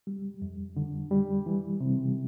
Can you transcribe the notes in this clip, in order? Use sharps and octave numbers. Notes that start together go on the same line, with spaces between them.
G3
F2
D3
G3
E3
C3